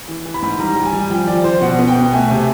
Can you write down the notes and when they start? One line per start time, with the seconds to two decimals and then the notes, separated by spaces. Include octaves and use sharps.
0.08 E3
0.25 E3
0.34 B5
0.42 G#2
0.59 G3 A#5
0.76 G3
0.85 G#5
0.93 G3
1.10 F3 G5
1.28 F3 D5
1.44 F3 C5
1.61 B2 F#5
1.79 B3
1.87 G5
1.95 B2
2.13 A3 G#5
2.30 C3